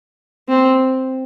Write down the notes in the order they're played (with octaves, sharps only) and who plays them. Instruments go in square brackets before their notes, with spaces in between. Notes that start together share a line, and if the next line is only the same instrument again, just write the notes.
[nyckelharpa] C4